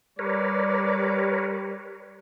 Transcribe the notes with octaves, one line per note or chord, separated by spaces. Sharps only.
G3 A#4 B4 C#5 D5